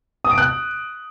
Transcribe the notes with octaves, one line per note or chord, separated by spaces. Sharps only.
D#6
D7
F#6